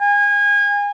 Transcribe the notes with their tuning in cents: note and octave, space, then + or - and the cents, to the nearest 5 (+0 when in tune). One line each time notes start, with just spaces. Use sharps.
G#5 -30